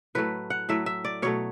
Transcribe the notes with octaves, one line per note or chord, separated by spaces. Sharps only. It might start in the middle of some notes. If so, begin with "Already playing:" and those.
A2 F#3 A3 B4
F#5
A2 F#3 A3 E5
E5
D5
B2 F#3 A3 C#5